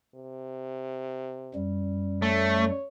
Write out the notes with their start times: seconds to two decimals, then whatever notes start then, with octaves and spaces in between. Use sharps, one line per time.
0.15 C3
1.55 F#2 G3
2.22 A3 C#5